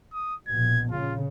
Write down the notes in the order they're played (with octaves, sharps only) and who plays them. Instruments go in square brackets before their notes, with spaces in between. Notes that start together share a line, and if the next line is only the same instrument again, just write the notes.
[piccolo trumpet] D#6
[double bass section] A#1 B2 [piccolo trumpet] G#6
[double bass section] C#3 [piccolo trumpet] F4